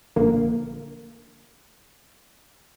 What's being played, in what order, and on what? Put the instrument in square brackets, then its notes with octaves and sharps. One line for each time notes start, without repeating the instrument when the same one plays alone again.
[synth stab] A#1 D3 A#3